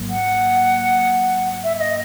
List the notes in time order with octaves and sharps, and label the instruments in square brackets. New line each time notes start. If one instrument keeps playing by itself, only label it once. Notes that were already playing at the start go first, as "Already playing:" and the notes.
Already playing: [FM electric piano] G#1 G#2 F#3 A#3
[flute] F#5
E5
E5
D#5